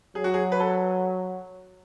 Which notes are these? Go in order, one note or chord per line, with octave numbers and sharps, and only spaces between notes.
F#3 G#4
F#4
G#4
B4
A4